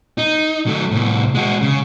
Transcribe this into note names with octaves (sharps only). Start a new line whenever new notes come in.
D#4
F#3 A3
C2 A2
G#3 F#4
C#3